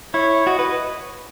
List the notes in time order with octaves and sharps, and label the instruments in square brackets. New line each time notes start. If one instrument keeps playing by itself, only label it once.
[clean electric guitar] E4 [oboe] C#5
[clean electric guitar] F#4 [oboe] D#5
[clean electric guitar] B4